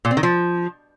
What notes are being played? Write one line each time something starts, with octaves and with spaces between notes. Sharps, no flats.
A#2
C4
D#3
F3